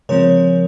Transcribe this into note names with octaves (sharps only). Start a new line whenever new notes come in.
C#3 F3 G#3 C4 A#4 C#5